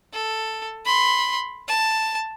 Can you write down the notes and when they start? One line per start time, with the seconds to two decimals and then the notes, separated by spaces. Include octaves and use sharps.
0.13 A4
0.85 B5 C6
1.68 A5